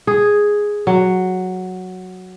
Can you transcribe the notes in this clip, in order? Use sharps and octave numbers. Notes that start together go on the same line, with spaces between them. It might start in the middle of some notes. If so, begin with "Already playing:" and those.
G#4
F#3